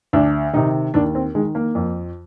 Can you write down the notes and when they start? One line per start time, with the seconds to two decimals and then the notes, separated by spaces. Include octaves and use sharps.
0.13 D2 D4
0.53 C3 D#3 D#4
0.94 D#2 D4
1.15 C4
1.35 D#3 G#3
1.55 A#3
1.75 F2